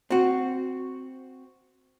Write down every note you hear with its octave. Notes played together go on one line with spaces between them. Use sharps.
C4 F#4